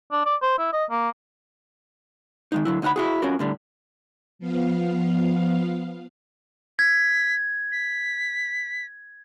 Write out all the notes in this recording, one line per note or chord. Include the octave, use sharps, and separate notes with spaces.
D4
D5
C5
E4
D#5
A#3
D#3 G#3 D#4
D3 F#3 E4
D2 D#4 F5 F#5 B5
E4 F#4 G#4
C#4 F4 F#4 A#4
A2 D3 G3
F3 B3 F5
G#6 B6
B6